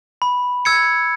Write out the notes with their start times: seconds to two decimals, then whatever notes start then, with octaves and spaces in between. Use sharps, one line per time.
0.22 B5
0.65 E6 G#6 C#7